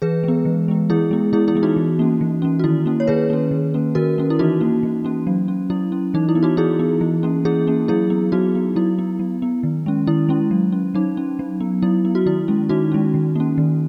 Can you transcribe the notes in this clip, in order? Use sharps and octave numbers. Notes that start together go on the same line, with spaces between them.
E3 G#4 B4
G#3 B3
E3
G#3 B3
E3 E4 G#4
G#3 B3
E3 E4 G#4
E4 G#4
G#3 B3
D#4 F#4
E3
A#3 C#4
E3
A#3 C#4
F#4
D#3 E4
A#3 C#4
C#5
D#3 G#4 B4
A#3 C#4
D#3
A#3 C#4
D#3 F#4 A#4
A#3 C#4
E4
E3 D#4 F#4
A#3 C#4
E3
A#3 C#4
F#3
C#4
F#3 E4
C#4
E3 D#4
E4
B3
D#4 F#4
E3 E4 G#4
B3
E3
A#3 C#4
E3 E4 G#4
A#3 C#4
F#3 E4 G#4
B3
F#3 D#4 F#4
B3
F#3 E4
B3
F#3
B3
D#3
G#3 C#4
D#3 E4
G#3 C#4
F#3
C#4
F#3 D#4
C#4
F#3
B3
F#3 E4
B3
F#4
D#3 E4
G#3 C#4
D#3 D#4 F#4
G#3 C#4
D#3
A#3 C#4
D#3